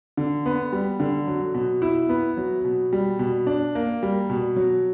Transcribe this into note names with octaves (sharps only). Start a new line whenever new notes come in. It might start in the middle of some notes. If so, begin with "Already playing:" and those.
D3
B3
G3
D3
F#3
B2
E4
B3
F#3
B2
G3
B2
D4
A#3
G3
B2
F#3